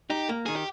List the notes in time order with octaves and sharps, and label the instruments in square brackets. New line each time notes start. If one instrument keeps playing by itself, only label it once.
[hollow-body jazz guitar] D#4 [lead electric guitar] G4
[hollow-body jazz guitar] A#3
[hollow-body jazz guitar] D#3 [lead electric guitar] G#4
[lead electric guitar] G4